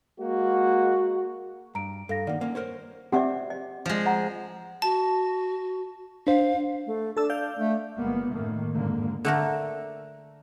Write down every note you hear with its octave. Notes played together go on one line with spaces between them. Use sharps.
G#3 A#3 F#4
G2 A#5 D7
G2 A4 F5 A#6
D#3 A#3 D5 F#5
A#3 C#4
A#4 C5 C#5
C4 G4 D5 E5 F#5
D#5
F3 G#3
D#5 F#5 A#5
F#4 A5
D4 C5 F5
A3
D4 A4 A5 E6
D5 F5 G6
A3
G1 G#3 A#3 B3
F#2 A2 D#3 A3 A#3
F2 G#2 D3 A#3
D3 A3 A#4